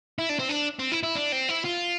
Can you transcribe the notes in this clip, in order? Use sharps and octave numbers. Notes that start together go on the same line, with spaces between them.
E4
D4
C4
D4
C4
E4
E4
D4
C4
E4
F4